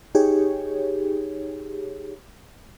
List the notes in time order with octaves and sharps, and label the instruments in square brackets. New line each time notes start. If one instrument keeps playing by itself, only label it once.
[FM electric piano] D#4 G4 G#4 C#5